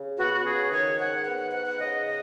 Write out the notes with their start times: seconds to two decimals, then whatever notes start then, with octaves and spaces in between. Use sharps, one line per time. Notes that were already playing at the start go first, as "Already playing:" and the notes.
Already playing: C#3
0.17 B3 F#4
0.34 F#4
0.44 C#3 G#4
0.72 D#3 C#5
0.98 G#2 F#5
1.25 B3 F#5
1.39 F#5
1.52 G#2 F#5
1.66 F#5
1.79 C#3 D#5
2.06 D#5